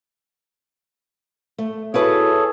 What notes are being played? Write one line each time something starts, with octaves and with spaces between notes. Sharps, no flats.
A3
E4 F#4 G#4 A4 B4 C#5